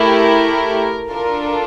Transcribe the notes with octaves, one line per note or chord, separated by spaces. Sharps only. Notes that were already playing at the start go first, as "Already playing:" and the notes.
Already playing: A3 E4 G4 A#4
D4 F4 A4 A#4